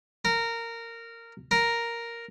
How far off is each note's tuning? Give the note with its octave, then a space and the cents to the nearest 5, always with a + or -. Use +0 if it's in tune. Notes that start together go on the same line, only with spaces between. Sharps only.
A#4 -15
A#4 +0